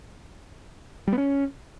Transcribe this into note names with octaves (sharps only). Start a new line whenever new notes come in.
G3
B3
C#4